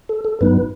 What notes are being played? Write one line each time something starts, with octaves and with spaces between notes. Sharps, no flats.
A4
A4
G2 F#3 B3 D#4 B4